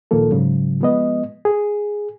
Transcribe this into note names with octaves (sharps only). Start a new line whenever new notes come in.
D2 A#2 D#3 F3 A#3 A4
G#2 C#3 F#3
F3 G#3 B3 D#5
G#4